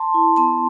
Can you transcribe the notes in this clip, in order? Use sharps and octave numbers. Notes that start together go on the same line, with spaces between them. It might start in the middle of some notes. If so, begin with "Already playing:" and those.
Already playing: A5 C6
E4
B3 A5 C6